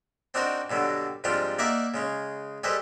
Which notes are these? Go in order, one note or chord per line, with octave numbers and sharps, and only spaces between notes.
C4 D4 D#4 F#4 A#4 C5
G2 B2 D3 F#3
F2 G#2 G3 D4 F4 F5
A#3 D#4 D5 E5 F#5
C#3 G#3 C#4
G3 G#4 A4 B4 C5 D#5